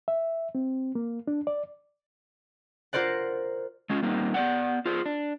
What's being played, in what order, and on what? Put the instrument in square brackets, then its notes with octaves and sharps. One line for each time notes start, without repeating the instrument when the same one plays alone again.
[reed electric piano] E5
C4
A#3
D4
D5
[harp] F4 A#4 C5 D5 F#5
[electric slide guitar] G#3 C#4 F4
G3 A#3 C4 D#4
B3 D5 F#5
F4 G#4 C5
D4